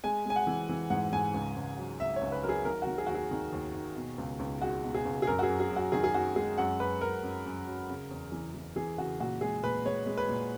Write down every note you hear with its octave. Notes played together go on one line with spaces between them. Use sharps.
G#3 G#5
G#3 G#5
F#5
E3
E3
G#2 F#5
G#2 G#5
C#2
C#2
F#3
C#2 E5
C#5
C#2
B4
F#3 A#4
G#4
D#3 A#4
D#3 F#4
G#4
D#2 F#4
G#4
D#3
D#2
D#2
B2
C#2
C#2
G#3 F#4
B2
G#4
C#2
G#4
F#2 A#4
F#4
G#4
F#2
G#4
F#2
F#4
D#3 G#4
G#4
F#2 F#4
G#3 G#4
F#2 F#5
F#2 B4
F#2 A#4
F#2
F#2
F#3
C#3
E2
E3
E3
E3 G#4
C#3 F#4
A#2 F#4
G#3 G#4
A#2 B4
G#3 C#5
G#3
B4
A#2